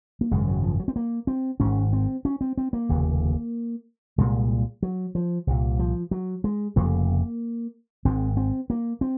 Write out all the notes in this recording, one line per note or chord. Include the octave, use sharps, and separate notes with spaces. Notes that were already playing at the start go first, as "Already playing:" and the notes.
A#3
G#1 F#2 C#3 G#3
F#3
F3
F#3
C4
A#3
C4
G#1 G#2 C#4
C4
C#4
C4
C4
A#3
F1 D#2 C#3
C2 A#2 G#3
F#3
F3
C2 A#2
F3
F#3
G#3
F1 F2 C#3 A#3
G#1 G#2 C4
C4
A#3
C4